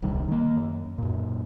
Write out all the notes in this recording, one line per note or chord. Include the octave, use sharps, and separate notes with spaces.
D#1 C2 D#3 G3
D#3 A#3
F#2
F#2 A#2